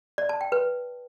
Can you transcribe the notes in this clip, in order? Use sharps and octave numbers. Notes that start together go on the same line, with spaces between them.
D5
A5
G5
B4